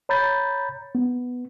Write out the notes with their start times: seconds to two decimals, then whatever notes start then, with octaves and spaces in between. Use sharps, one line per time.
0.09 C#5 A#5 B5 G6 A6
0.95 B3